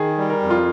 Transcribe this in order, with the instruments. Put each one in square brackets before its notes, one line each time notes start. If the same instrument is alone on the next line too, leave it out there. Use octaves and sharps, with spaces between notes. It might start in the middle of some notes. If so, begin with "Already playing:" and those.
Already playing: [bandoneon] D#3 [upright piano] G#4
[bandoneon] G3
[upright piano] A#4
[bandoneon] F2
[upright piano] F4